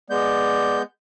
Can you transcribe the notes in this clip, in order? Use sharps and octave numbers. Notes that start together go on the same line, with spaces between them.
G#3 B3 D5 G6